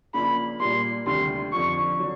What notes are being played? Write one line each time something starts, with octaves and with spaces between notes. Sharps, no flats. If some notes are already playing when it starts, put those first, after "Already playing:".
C#3 F3 A#3 D4 F4 B5
A#2 G3 A#3 C6
D2 C3 D#3 G3 C6
F2 D3 F3 C#6
D3 F#3